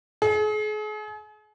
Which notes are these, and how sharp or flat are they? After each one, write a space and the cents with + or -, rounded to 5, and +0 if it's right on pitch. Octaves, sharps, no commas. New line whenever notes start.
G#4 +40